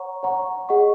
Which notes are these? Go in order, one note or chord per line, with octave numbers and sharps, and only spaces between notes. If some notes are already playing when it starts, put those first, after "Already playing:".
Already playing: C#5 F#5 A#5 C#6
C#5 F#5 A#5 C#6
G#4 D#5 F#5 C#6